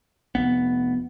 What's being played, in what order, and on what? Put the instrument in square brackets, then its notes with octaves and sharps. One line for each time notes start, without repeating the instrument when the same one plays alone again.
[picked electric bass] F1 E2 B3